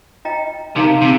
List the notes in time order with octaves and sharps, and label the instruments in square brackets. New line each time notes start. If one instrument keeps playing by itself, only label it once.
[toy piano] F4 D#5 G5 A#5
[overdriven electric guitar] C3 [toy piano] D#4 A#4 F5 A#5
[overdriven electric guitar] C3